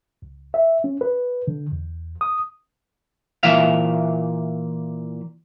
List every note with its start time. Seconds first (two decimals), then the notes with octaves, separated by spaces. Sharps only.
0.22 C#2
0.54 E5
0.84 C#4
1.01 B4
1.47 D3
1.72 E2
2.21 D#6
3.43 A#2 E3 E5 F5